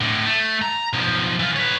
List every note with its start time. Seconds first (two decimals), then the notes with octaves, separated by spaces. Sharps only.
0.01 A2 D3
0.25 A3
0.62 A#5
0.93 B1 F3
1.39 E3 F4
1.56 B4 C#5